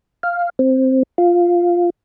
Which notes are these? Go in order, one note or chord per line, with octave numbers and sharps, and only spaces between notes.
F5
C4
F4